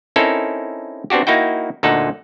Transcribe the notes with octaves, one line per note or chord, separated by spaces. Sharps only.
C4 C#4 D#4 E4 A4 A#4
B3 C4 D4 F#4 G4
A#3 D#4 E4 F#4 G5
D2 A#2 D#4 A4 F#5